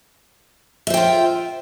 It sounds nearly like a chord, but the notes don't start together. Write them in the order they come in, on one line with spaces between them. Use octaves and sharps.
E5 C5 G5 F4